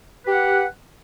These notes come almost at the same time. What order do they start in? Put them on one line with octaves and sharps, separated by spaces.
B4 G4 F#5